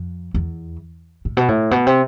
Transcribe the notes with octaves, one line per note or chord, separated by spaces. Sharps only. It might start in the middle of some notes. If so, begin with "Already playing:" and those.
Already playing: F2
E2
A2
B2
A2
B2
C3